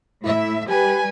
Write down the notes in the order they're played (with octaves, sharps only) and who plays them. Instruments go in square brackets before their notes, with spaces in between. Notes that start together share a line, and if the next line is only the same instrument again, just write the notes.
[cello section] A2 E5 [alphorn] E4
[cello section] G3 B4 [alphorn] G4 [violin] G#5